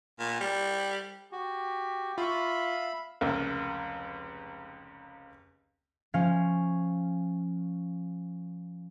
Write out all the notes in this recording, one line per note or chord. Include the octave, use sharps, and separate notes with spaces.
A#2
G3
F#4 G4
F4 E5 F5 B5 C#6
F1 C#2 A#3
F3 C#4 F5